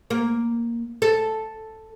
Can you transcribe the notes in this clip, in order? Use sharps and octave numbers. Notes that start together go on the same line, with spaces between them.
A#3
A4